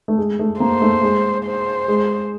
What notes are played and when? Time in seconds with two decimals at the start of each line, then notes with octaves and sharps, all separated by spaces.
0.08 A3
0.18 G#3
0.39 A3
0.60 A#3 C5
0.82 A3
1.03 G#3
1.45 C5
1.88 G#3